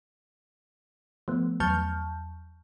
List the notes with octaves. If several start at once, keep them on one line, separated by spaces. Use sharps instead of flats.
F3 A3 B3
E2 F#3 A5 C#6 F6 G6